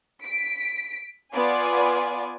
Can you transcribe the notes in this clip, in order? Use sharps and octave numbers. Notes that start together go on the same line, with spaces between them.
B6 D7
B3 F4 D5 G#5